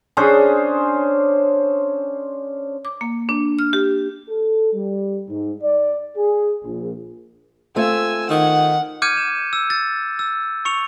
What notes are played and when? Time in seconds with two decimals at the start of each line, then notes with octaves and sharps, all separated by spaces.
0.17 C#4 D4 G#4 C5
2.85 D6
3.01 A#3
3.29 D4
3.59 F6
3.73 G4
4.28 A4
4.73 G3
5.28 G#2
5.62 D5
6.17 G#4
6.64 A#1
7.76 A3 C4 F4 G#5 E6
8.30 D#3 F#5
9.02 D6 F6 G6 G#6 C#7 D#7
9.17 E7
9.53 E6
9.70 A6
10.19 E6
10.65 C#6 C#7 F7